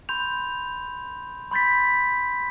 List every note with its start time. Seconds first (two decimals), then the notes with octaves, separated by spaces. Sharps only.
0.09 B5 C6 G6 F7
1.51 B5 C6 G6 A6 B6